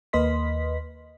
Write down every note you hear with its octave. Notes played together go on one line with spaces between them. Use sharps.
D#2 A#3 B4 D#5 C6 B6